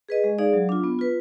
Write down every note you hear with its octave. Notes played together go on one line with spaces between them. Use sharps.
G#4 B4 D#5
G#3
D#4 G#4 D5 F5
F#3
D4 F4
B3
F4 B4